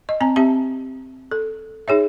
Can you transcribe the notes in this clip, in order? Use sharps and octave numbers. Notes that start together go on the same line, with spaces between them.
D#5
C4 G#5 A#5
C4 G4 E5 A5
A4
D#4 G#4 C#5 E5